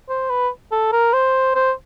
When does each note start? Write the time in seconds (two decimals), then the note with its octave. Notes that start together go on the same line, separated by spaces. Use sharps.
0.09 C5
0.30 B4
0.72 A4
0.92 A#4
1.13 C5
1.55 C5